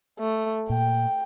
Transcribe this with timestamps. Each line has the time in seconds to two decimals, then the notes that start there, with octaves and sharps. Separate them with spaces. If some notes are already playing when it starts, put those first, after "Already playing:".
0.19 A3
0.70 A#2 G5